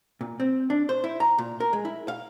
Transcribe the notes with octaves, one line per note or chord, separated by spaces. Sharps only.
A#2
C4
D4
C5
E4
A#5
A#2
A#4
G#3
E4
F5